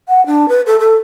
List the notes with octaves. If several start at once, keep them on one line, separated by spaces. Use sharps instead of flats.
F#5
D4
B4
A4
A4